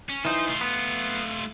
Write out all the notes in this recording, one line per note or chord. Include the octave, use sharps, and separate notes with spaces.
C#4
E3 D#4 F4 C5
A3 F4
B3